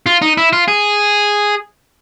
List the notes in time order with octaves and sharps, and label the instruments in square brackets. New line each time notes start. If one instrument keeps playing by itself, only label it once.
[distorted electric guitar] F4
D#4
E4
F4
G#4